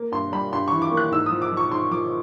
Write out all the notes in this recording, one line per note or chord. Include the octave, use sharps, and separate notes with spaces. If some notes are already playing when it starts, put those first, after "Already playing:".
Already playing: A#3
G2 C6
G3 B5
G2 C6
E3 C#6
D6
A#3
F#6
G#2 E6
D#6
F3
D6
F3
C#6
G#2 C6
F3 D6